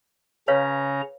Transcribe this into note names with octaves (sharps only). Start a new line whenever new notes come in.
C#3 C#4 B4 C#5 F5 A#5